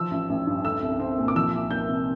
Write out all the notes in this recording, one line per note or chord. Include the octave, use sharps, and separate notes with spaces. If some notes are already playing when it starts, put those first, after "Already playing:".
Already playing: F3 E6
A1
A1
G2
A3 E6
C2
C4
A#2
D6
F3 E6
C2
A#3 G6
C3